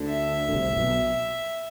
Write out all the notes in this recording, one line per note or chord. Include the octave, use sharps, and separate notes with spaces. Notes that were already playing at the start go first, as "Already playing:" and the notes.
Already playing: D2 D3
E5
D3
C2 C3
A2
B1 B2